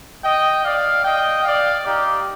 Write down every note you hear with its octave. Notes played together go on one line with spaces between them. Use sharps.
D#5 G5
D5 F5
D#5 G5
D5 F5
D#4 G4